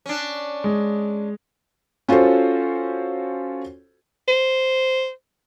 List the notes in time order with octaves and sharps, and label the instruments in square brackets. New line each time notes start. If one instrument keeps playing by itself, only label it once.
[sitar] C#4 D4
[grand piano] G#3
[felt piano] C#4 F4 F#4 A4 C5
[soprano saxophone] C5